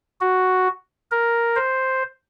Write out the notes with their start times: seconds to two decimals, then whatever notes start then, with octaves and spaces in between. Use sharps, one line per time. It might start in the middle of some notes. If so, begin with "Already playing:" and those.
0.21 F#4
1.11 A#4
1.56 C5